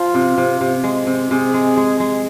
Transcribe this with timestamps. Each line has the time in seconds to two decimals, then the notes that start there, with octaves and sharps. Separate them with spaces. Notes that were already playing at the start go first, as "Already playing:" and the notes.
Already playing: F3 F4
0.14 C3
0.38 C3
0.61 C3
0.84 G#3
1.07 C3
1.31 C3 G#4
1.54 G#3
1.77 G#3
2.00 G#3